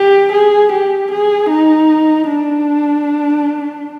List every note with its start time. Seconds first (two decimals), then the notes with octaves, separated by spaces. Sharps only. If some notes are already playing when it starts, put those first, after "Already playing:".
Already playing: G4
0.32 G#4
0.72 G4
1.11 G#4
1.50 D#4
2.28 D4